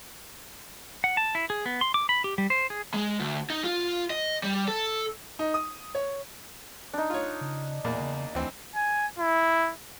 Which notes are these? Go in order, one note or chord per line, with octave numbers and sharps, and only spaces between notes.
F#5
A5
E4
G#4
B3
C6
D6
B5
G4
G3
C5
G#4
G#3
D2
D#4
F4
D#5
G3
A4
D#4
D#6
C#5
D4 D#4
F4 C#5
C#3
E2 A#2 A#3
C#3
D2 E3 C4
G#5
E4